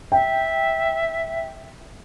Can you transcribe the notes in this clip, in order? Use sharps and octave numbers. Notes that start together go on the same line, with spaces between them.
E5 G5